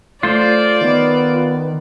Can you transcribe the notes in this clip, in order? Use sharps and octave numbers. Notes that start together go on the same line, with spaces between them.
A3 F4 C5 D5
D#3 B3